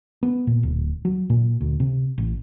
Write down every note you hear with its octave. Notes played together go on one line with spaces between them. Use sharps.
B3
A#2
D1
F#3
A#2
D2
C3
A1